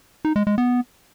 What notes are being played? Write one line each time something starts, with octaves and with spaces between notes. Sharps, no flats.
D#4
G#3
G#3
B3